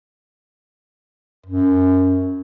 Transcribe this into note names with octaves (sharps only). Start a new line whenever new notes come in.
F#2